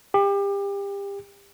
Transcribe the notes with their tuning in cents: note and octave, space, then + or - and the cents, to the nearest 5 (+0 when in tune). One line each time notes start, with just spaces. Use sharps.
G4 +30